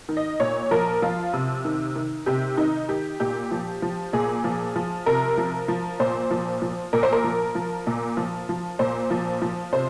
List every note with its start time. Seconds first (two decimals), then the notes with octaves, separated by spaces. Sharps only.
0.09 D#3
0.17 D#5
0.40 A#2 C#5
0.71 F3 A#4
1.02 F3 F4
1.33 C3
1.65 D#3
1.96 D#3
2.26 C3 G4
2.57 D#3 D#4
2.89 D#3 G4
3.20 A#2 G4
3.51 F3
3.82 F3
4.13 A#2 G#4
4.44 F3
4.75 F3
5.06 C3 A#4
5.37 F3
5.68 F3
6.00 A#2 C5
6.31 F3
6.62 F3
6.93 A#2 A#4
7.03 C5
7.12 A#4
7.24 F3
7.55 F3
7.87 A#2
8.17 F3
8.49 F3
8.79 A#2 C5
9.10 F3
9.41 F3
9.72 C3 C5